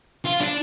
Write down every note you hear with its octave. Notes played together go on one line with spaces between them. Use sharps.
F4
D4